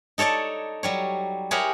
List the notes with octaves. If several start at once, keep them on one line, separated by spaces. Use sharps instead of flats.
D#4 A4 C#5 D5 A5
F#3 G3 C#5
E4 G4 G#4 A#4 C#5 F#5